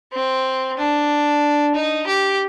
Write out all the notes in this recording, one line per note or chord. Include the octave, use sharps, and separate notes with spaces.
C4
D4
D#4
G4